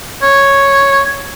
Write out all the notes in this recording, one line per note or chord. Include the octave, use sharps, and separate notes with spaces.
C#5